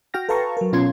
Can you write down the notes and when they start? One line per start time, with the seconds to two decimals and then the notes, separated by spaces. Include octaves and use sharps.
0.14 F#4 G5 F6 A#6
0.29 A4 B4 F5 A5 A#5 C#6
0.57 F#3 A#4
0.73 B2 C#4 F4 C6 G#6